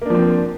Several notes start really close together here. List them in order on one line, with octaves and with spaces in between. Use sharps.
A#3 D4 F3 C4